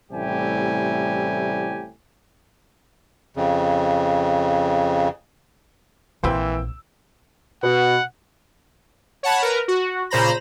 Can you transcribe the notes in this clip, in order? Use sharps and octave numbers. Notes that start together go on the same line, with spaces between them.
A1 A2 C3 G3 G4 G#5
F2 C#3
A#1 E3 A#3 C4 B4 C5 G5 E6
B2 F#5
C#5 F#5 A5 B5
A#4 B4
F#4
A#2 C#3 C5 A#5 B5 A#6